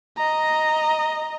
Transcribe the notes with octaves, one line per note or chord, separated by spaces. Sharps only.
D#5 A#5